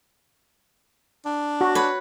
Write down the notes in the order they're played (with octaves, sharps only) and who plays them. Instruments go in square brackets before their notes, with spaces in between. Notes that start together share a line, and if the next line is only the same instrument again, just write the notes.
[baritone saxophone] D4
[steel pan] F#4
[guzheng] B4 C#5